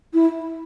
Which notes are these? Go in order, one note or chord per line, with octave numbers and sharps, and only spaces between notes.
E4